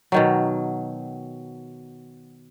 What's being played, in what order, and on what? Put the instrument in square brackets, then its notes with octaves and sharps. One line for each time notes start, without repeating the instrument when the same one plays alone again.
[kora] B2 D#3 F#3